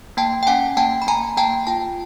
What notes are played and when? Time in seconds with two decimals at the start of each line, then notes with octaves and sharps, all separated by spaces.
0.17 A#3 G5 A5
0.43 G5
0.47 C#4 F#5 G#5
0.77 A#3 G5 A5
1.02 B5
1.07 A#3 G#5 A#5
1.37 A#3 G5 A5
1.67 F4 G5 A5